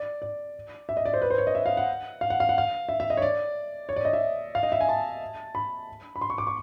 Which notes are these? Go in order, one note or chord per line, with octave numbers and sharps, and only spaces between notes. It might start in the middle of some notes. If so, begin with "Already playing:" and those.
Already playing: D5
D5
E5
D#5
D5
C5
B4
C5
C#5
D#5
E5
F5
F#5
F5
F#5
F5
F#5
F5
E5
E5
D#5
C#5
D5
C#5
D5
D#5
E5
F5
D#5
E5
G#5
A5
B5
B5
C6
C#6
D6
C#6